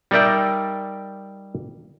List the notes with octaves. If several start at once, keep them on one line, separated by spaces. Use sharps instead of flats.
G3 D#4 A#4 D5 E5 G5